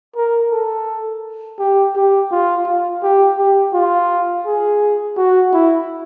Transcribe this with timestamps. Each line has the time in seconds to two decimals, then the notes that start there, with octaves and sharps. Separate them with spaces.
0.16 A#4
0.51 A4
1.59 G4
1.96 G4
2.31 F4
2.67 F4
3.03 G4
3.37 G4
3.73 F4
4.46 G#4
5.17 F#4
5.53 E4